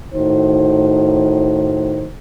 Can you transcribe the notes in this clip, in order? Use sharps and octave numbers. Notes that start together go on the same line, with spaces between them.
A2 D#3 D#4 F#4 C5